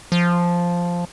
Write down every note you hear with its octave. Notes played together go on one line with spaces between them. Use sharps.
F3